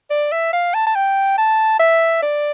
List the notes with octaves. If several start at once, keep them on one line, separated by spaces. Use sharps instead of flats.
D5
E5
F5
A5
A5
G5
A5
E5
D5